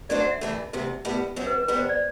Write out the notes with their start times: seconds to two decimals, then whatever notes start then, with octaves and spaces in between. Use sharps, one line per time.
0.09 F#3 A3 D4 A4 C5 D5
0.20 F#5
0.30 E5
0.41 G2 E3 A3
0.73 D2 C3 E3
1.05 A2 G3 B3 E4
1.36 F#2 F#3 C4
1.47 B4
1.58 B4
1.68 C3 G3 B3 B4
1.79 C5
1.89 D5